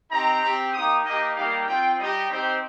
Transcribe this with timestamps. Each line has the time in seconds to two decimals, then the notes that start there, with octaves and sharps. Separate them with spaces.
0.11 C4 D#4 G4 A#5
0.42 C4 G4
0.73 A#3 D#4 G4 D#6
1.04 A#3 D#4 G4 D#5
1.36 G3 A#3 D#4 G4 F5
1.67 C4 F4 G5
1.98 G3 D#4 G4 D#5
2.29 C4 D#4 G4 C5